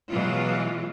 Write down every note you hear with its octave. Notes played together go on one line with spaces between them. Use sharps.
B2 E3 F#3 G#3 F4